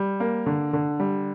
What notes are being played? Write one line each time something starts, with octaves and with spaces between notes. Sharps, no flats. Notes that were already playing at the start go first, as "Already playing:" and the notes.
Already playing: G3
A#3
D3
D3
G3